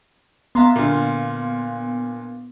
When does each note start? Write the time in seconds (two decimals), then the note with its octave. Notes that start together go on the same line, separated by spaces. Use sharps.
0.55 B3 E5 F5 A#5 C6
0.76 A#2 D3 F4